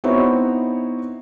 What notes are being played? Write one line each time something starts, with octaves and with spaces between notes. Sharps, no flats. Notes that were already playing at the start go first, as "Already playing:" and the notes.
B3 C4 D#4 E4 F#4 C#5